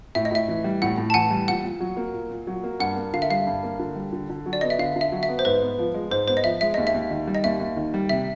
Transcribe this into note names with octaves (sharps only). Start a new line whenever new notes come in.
A2 E5
D#5
A2 E5
E3
G3
A2 F#5
A2
A5
E3 F#5 G#5
G3
A#2 F#5
A#2
F#3
A#3
A#2
A#2
F#3
A#3
G2 F#5
A#3
D3 F5
E5
G3 F5
G2
A#3
D3
G3
D3
D3
F#3
D5
B3 D#5
E5
D3 F5
D3
E5
F#3
E5
B3
C5
G#2 B4
B3
F3
G#3
G#2 C5
B3 C5
D#5
F3 E5
G#3 E5
D#2 D#5
E5
D#2
D#3
G3
D#5
D#2 E5
D#2
D#3
G3
C3 E5